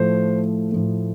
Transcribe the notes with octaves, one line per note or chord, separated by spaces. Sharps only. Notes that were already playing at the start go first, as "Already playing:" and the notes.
Already playing: A2 F3 A3 C5
A2 F3 A3